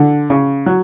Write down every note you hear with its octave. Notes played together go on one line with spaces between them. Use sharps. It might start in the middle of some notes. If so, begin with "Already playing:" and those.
Already playing: D3
C#3
F#3